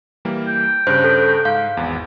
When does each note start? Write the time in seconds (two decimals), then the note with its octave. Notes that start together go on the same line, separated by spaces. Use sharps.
0.25 E3 G3 A#3
0.48 G5
0.87 G2 C#3 C5 F#6
1.04 A4
1.45 G#2 F5
1.77 G#1 E2